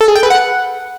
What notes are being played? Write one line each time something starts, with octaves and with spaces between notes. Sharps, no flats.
A4
G#4
G5
B4
F#5